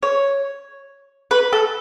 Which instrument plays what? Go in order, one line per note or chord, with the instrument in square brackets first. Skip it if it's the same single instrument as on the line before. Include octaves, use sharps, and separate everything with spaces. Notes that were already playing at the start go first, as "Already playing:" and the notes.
[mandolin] C#5
B4
A4